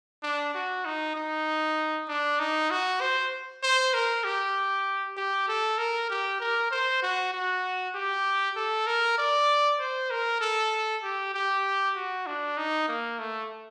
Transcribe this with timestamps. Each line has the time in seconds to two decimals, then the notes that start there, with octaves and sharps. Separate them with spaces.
0.23 D4
0.55 F#4
0.85 D#4
1.16 D#4
2.09 D4
2.40 D#4
2.71 F#4
3.01 C5
3.63 C5
3.94 A#4
4.24 G4
5.17 G4
5.48 A4
5.78 A#4
6.10 G4
6.40 A#4
6.72 C5
7.03 F#4
7.33 F#4
7.95 G4
8.56 A4
8.87 A#4
9.18 D5
9.80 C5
10.10 A#4
10.41 A4
11.04 G4
11.34 G4
11.96 F#4
12.26 D4
12.58 D#4
12.88 A#3
13.19 A3